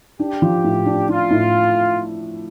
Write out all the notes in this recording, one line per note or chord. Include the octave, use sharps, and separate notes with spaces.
D4 G4
F3
A2
D4
D4 F4
A2